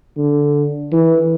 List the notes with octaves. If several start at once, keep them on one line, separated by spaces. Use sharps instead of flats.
D3
E3